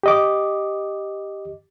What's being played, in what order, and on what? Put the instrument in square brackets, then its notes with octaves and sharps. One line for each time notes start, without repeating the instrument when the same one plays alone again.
[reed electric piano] G4 D#5 D6